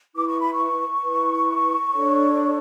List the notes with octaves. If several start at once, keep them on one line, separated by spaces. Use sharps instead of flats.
E4 B4 D6
C#6
B5
C#6
E4 B4
D4 A4 C#5